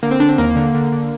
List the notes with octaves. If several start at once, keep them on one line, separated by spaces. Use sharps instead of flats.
D3 A#3
C4
D3 D4
C4
D#2 A#3
D3
D3
D3